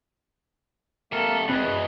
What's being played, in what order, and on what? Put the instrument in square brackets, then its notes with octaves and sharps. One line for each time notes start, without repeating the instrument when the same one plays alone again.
[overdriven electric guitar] C3 A4 [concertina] A#3 A#4
[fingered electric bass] G#1 C3 C4 [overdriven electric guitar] E2 G#3 [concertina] B4
[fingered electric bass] F#2